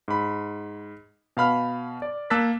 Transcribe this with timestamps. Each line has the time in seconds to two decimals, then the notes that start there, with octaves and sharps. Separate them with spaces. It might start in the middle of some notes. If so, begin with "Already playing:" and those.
0.08 G#2 B5
1.37 B2 F5 B5 F6
2.02 D5
2.30 A#3 A5 E6 F#6 A6 B6